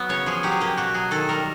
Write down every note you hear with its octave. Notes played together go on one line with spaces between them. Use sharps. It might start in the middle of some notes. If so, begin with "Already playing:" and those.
Already playing: F#3 B3
C#3 C#5
F3 G#4
F#3 G4
G#4
A#3 G4
B2 F#4
F#3 G#4
D#3 A4
G3 A#4